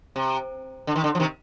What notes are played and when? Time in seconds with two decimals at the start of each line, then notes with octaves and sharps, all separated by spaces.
0.16 C3
0.87 D3
0.96 D#3
1.04 D3
1.15 F3
1.20 C3 D#3